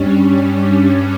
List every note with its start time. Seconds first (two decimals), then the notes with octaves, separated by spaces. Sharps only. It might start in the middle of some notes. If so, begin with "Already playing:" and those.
Already playing: G2 G3 C#4
0.12 C#4